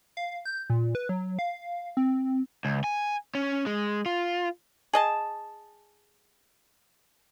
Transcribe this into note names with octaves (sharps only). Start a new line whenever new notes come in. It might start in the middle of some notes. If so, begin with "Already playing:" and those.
F5
G6
A#2
B4
F#3
F5
C4
C#2
G#5
C#4
G#3
F4
G#4 D#5 A5